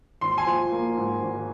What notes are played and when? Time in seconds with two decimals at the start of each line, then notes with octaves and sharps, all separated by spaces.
0.21 G#1 C6
0.37 G#5 C6
0.46 F3
0.72 A#3
0.97 G#2
1.22 G#1